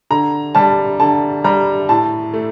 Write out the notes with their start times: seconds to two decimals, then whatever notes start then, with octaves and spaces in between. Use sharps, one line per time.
0.11 D3 A#5
0.55 G3 A5
1.00 D3 A5
1.44 G3 A#5
1.89 A2 A5
2.34 A3